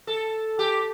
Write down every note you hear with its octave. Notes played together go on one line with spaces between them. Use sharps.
A4
G4